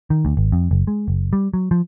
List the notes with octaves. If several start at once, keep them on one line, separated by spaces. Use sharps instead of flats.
D#3
D2
G#1
F2
F#1
G#3
F#1
G3
F#3
F3